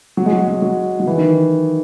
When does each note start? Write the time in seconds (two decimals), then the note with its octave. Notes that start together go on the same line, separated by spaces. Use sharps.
0.17 F#3
0.26 G#3
0.33 F#3
0.48 F#3
0.62 F#3
1.00 F#3
1.07 E3
1.17 D#3